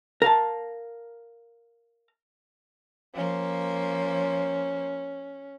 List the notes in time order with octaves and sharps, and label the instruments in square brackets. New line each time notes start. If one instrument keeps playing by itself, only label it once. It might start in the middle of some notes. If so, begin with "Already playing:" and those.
[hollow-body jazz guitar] A#4 F5 A5
[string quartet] F3 A#3 C5 [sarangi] C#4